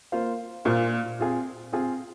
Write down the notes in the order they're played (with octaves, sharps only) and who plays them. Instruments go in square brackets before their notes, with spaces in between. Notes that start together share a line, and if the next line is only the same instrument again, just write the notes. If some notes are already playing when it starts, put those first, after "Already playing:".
[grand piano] A#3 F4 C5 F5
[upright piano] A#2 [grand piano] A#3 F4 C5 F5
[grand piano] C4 F4 G#4
C4 F4 G#4